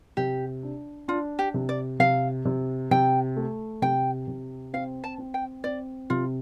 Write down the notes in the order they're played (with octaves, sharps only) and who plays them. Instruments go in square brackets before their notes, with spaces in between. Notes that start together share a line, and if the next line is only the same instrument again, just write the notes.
[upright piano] C3 [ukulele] G4
[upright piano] D4
[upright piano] D4 [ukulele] F4
[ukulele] G4
[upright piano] C3
[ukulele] D5
[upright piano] C3 [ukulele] F5
[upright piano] C3
[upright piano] C3 [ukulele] G5
[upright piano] A3
[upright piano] C3 [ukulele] G5
[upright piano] C3
[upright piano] C4 [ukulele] F5
[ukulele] A5
[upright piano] C4
[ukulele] G5
[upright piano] C4 [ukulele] D5
[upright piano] C3 [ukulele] F4